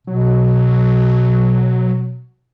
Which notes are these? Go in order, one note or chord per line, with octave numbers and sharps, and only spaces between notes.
B2 F#3